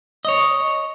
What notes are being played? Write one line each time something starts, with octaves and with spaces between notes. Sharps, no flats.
C#5 D#5